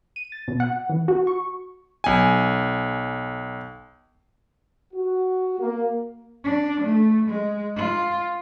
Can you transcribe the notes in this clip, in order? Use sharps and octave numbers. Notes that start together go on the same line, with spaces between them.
D#7
A6
B2
F#5
E3
F#4
C#6
B1 G#5
F#4
A#3
D4
A3
G#3
F4